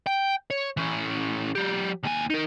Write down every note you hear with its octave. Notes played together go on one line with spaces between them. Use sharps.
G5
C#5
E3 C#4
F#3 G4
D#2 G#5
D#4 A#4